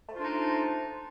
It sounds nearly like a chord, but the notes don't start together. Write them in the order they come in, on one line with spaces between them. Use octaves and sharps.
A3 C5 F4 D4 D#4